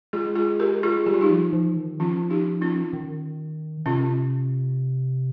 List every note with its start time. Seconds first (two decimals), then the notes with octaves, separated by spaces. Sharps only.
0.13 G#3 F4 G#4
0.35 F4 G#4
0.60 G4 A#4
0.83 F4 G#4
1.06 G3 G4
1.14 F4
1.21 D#4 G4
1.30 F3
1.53 F3
1.76 D#3
1.99 F3 C#4 F4
2.30 D#4 G4
2.61 C#4 F4
2.93 D#3
3.86 C3 C#4 F4